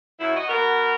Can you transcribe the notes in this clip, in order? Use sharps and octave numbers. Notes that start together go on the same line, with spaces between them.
F#2 E4
F#4 D#5
B3 F#4 A#4